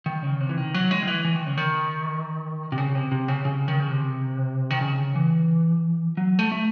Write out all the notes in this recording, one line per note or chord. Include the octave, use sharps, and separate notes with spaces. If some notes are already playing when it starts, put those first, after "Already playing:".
D#3
C#3
C3
E3
D#3
F#3
G#3
D#3
E3
E3
D#3
C#3
D#3
C3
C#3
C3
C3
C#3
C#3
D#3
C#3
C3
D#3
C#3
E3
F#3
A3
A3